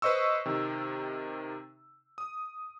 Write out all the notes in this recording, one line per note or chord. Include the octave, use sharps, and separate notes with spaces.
B4 C5 D#5 C#6 E6
C3 D#3
D#6